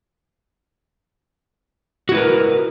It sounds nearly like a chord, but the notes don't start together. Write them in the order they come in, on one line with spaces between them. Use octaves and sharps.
F#4 E4 B4 A#4